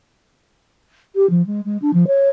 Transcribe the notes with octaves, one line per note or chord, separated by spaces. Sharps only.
G4
F3
G#3
G#3
D4
F3
C#5